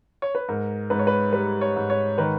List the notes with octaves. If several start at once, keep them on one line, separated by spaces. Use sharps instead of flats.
C#5
B4
G#2 A#4
G#2 B4
C#5
B4
G3 B4
C#5
G#2
C#5
D#3 B4